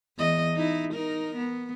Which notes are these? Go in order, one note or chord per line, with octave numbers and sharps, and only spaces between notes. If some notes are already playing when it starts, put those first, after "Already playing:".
E2 D#5
D#4 E4
D#4 A#4
B3